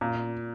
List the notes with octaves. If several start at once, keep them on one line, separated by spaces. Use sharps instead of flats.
A#2